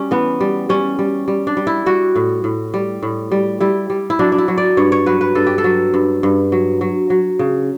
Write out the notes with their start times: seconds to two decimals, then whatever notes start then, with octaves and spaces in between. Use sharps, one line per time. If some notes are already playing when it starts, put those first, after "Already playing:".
Already playing: G3 C#4
0.11 E3 B3
0.41 G3
0.69 G3 C#4
0.99 G3
1.28 G3
1.47 D4
1.57 G3
1.67 E4
1.86 G3 F#4
2.16 A2
2.44 A2
2.74 G3
3.03 A2
3.32 G3
3.60 G3 E4
3.90 G3
4.10 E4
4.19 F#3 D4
4.32 D4
4.38 E4
4.48 F#3
4.58 D5
4.77 G2 C#5
4.92 C#5
5.06 F#3 B4
5.21 B4
5.35 G2 A4
5.47 G4
5.58 A4
5.64 F#3
5.94 G2
6.23 G2
6.52 F#3
6.81 F#3
7.10 F#3
7.39 C#3